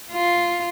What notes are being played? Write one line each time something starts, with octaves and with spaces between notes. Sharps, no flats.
F4